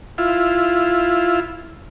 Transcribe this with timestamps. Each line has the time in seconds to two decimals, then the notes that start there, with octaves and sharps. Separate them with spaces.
0.18 E4 F4